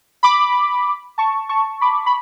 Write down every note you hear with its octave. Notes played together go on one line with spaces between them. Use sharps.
B5 D6
A5 C#6
A5 C#6
B5 D6
B5